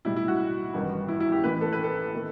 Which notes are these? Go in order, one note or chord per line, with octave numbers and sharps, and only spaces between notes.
B1 A2 G3 E4
E4
F#4
A1 G2 D#3 G3
E4
E4
G4
A1 A2 E3 B4
A4
B4
A4
D#3 A3